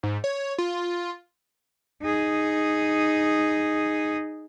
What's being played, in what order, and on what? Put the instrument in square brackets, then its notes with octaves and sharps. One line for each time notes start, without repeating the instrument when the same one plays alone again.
[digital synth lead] G#2
C#5
F4
[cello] D#4 G#4